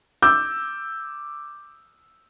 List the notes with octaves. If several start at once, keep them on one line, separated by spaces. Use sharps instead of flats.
D6 E6 G6